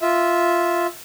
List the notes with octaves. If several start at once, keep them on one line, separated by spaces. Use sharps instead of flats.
F4 E5